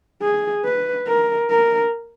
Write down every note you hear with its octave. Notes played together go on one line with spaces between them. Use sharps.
G#4
B4
A#4
A#4